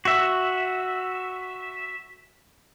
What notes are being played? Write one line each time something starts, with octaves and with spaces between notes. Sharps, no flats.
F#4 E5